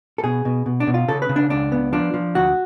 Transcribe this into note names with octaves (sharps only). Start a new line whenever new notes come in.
A4
B2 G#4
B2
B2
D4
B2
F4
C#3 A4
B4
C#3
D4
C#2 D4
B3
F3 D4
F3
D2 F#4